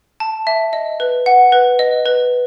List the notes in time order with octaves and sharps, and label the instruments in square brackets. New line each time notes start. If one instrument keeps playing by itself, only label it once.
[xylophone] A5
E5
D#5
B4
F#5
B4
D#5
B4